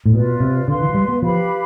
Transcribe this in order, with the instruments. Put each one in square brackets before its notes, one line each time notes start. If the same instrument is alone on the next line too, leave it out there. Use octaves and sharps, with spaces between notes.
[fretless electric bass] A2
[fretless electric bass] B2 [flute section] F4 B4 D5
[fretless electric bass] C3
[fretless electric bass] D3 [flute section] B4 F5 C6
[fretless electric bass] E3
F3
G3
B3
[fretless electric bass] F3 [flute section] G4 B4 F5 B5